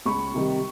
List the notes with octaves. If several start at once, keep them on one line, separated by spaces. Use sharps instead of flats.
C#2 B5 C#6
C3 D#3 G3